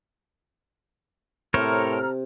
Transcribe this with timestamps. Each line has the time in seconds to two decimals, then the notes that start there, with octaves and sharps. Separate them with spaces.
1.54 A2 C3 A4 A#4 C5 C#5 A#5 F6